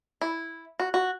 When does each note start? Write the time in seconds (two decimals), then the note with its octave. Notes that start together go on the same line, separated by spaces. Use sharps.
0.21 E4
0.79 F#4
0.94 F#4